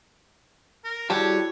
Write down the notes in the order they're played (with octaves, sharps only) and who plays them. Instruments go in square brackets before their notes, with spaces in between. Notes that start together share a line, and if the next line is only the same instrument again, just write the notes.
[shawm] A#4
[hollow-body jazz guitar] G3 G5 A5 [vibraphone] E4 F#4 G#4 [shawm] C#5